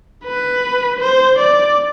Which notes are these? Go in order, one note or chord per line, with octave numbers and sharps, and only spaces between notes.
B4
C5
D5